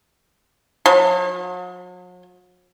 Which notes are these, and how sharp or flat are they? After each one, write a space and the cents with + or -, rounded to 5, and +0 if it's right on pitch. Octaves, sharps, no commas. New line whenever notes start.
F#3 -45